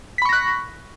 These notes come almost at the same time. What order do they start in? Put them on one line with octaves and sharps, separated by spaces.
B6 B5 C#6 A#6 F#6